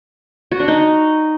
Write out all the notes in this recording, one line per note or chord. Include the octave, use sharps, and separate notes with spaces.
F#4
D4
D#4